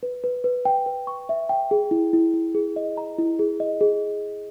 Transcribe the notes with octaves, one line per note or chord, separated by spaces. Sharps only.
B4
B4
B4
G5
B4
C#6
E5
G5
G#4
E4
E4
E4
G#4
D#5
A#5
E4
G#4
D#5
G#4